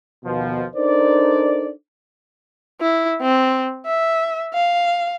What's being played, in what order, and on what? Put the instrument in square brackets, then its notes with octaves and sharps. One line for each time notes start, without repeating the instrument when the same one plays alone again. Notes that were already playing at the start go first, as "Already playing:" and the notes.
[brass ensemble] D#2 B2 F3
D4 D#4 A4 A#4 C5 D5
[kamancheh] E4
C4
E5
F5